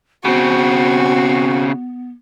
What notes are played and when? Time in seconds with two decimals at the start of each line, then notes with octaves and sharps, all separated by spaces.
0.25 C#3 B3 C4 F#4